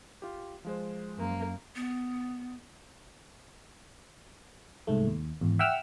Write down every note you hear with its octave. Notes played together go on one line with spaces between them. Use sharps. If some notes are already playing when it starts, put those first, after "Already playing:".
F4 G4
F3 G#3 C5
F#2 A#3
B3
C2 G#2 A3
D#2
G#1 E2
E5 F#5 G5 E6 F6